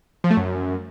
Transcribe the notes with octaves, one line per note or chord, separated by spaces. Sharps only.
F3
A3
F#2